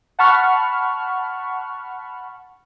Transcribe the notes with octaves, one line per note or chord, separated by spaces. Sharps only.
F#5 A5 B5 C#6 F6